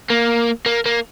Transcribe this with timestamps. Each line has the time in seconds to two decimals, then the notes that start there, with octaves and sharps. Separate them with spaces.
0.10 A#3
0.66 A#3
0.86 A#3